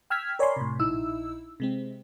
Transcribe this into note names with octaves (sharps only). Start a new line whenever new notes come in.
G5 E6 F6 G#6 B6
A#4 C#5 D5 G#5 B5 C6
A2 C3
A#1 D#4 E4 E6
C3 G#3 C4